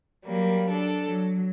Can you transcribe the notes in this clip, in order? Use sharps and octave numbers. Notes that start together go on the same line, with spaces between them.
F#3 G3 A#3
D4 A4
F#3